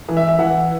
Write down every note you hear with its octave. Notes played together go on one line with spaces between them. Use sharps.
E3
E5
E5
E3 F#5